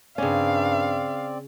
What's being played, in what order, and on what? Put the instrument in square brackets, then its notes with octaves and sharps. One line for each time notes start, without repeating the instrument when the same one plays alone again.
[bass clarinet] G2 [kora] C#3 C#4 [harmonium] C4 D5 [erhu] F5